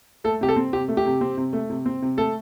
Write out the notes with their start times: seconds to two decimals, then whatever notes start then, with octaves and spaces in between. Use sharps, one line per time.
0.24 A3 A4
0.41 C3 G4
0.49 A4
0.56 C4
0.73 C3 G4
0.88 A3
0.97 G4
1.05 C3
1.21 C4
1.37 C3
1.53 A3
1.70 C3
1.86 C4
2.02 C3
2.17 A3 A4